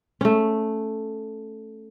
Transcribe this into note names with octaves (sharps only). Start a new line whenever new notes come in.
A3 C#4